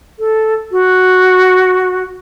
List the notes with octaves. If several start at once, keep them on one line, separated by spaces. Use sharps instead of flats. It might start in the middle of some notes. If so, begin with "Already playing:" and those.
A4
F#4